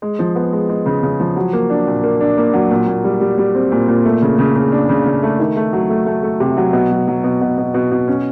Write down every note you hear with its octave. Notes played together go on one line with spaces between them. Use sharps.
G#3
F3
B3
G#3
G#3
C#3
C#3
F3
F#3
A#3
D4
A#2
A#3
D4
A#3
F#3
A#2
A#2
G3
G3
G3
C4
A#2
A#2
A3
C#3
C#3
C#3
D4
C#3
C#3
A3
D#3
A3
F#3
A3
A3
A3
C3
F#3
B2
F#3
F#3
B2
B2
B2
B2
B2
C#4